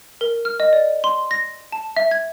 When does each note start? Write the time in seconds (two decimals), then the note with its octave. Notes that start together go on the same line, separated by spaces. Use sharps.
0.21 A#4
0.45 F6
0.60 D#5
0.73 D5
1.04 C6
1.31 A#6
1.72 A5
1.97 E5
2.11 G#6